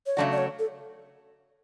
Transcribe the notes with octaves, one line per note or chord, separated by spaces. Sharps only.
C#5
C#3 F#3 A3 D4 F#4 D5
D5
C#5
A4